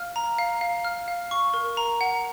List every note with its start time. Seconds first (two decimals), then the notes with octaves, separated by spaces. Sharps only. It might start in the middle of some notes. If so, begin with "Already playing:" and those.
Already playing: F5 F6
0.16 A#5
0.38 F5
0.61 F5
0.85 F6
1.08 F5
1.31 C#6
1.54 A#4
1.77 A#5
2.01 F#5